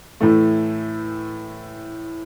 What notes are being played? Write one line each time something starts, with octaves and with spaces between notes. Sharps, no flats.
A2 E3 A3